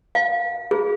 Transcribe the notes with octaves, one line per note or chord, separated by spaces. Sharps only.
F5
G#4